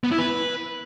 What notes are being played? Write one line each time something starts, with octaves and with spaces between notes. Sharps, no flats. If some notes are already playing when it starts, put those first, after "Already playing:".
B3
E4
B4